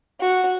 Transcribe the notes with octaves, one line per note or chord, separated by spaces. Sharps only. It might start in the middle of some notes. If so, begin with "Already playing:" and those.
F#4